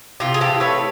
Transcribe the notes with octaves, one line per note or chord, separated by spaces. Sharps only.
C3 F4 G4
G#4
E3 G4 A4
A3 B4 C#5